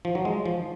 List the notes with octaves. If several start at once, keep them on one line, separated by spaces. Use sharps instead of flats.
F3
F#3
G#3
F3